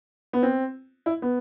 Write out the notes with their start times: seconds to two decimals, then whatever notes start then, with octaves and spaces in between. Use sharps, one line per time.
0.33 B3
0.43 C4
1.06 E4
1.22 B3